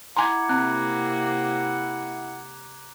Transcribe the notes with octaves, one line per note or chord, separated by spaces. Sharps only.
E4 F#5 G#5 A#5 C6 D6 G#6
C3 A#3 C4 F#6